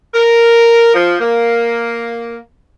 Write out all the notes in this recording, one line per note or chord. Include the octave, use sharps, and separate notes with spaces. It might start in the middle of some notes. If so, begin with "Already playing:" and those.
A#4
F3
A#3